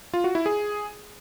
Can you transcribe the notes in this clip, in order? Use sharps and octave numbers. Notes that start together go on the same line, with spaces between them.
F4
F#4
E4
G#4